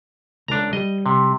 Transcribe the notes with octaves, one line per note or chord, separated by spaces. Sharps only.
C#2 D4 A4 A#5
G3 D#5
C3